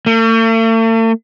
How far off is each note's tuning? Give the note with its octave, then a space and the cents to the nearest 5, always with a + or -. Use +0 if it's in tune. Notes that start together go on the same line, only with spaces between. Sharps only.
A3 +45